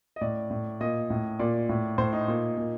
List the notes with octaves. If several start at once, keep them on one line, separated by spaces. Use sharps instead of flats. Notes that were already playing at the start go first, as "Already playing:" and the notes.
D#5
A2 D5
A2
A#2 D#5
A2
A#2 D5
A2
A2 C5
D#4
A#2
A#2